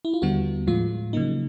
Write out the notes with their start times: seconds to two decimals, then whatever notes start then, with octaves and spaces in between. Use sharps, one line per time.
0.05 E4
0.14 F4
0.22 D#2 D3 G3 B3 F#4
0.67 A2 F3 G#3 F4
1.13 C#3 F#3 A#3 D#4